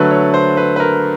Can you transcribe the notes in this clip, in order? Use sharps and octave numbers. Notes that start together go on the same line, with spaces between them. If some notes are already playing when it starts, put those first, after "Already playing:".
Already playing: D3 F#3 A3 B4
C#5
C5
B4
B4
A#4